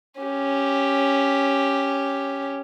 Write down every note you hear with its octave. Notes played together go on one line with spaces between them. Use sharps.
C#4 G4